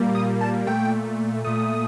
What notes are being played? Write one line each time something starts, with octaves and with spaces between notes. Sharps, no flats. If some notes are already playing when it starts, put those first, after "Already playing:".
Already playing: A#2 G3 A#3
D#6
A5
A#2 A3 G5
A#2 A3 D#6